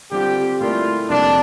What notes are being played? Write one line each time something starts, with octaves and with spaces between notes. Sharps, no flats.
D3 G3 C4 F4 G4
A#2 A3 E4 F4 A#4 D5
F2 C3 G3 A#3 D4